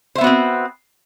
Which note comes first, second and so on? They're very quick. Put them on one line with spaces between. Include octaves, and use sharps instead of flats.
C5 E5 B3 F#4 C4